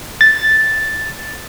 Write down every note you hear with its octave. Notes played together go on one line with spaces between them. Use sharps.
A6